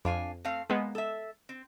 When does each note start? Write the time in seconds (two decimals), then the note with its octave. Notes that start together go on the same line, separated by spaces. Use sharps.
0.05 F2 D4 F5 G#5
0.45 A3 C4 F5
0.70 G#3 A#3 B3
0.95 A4 E5
1.49 C4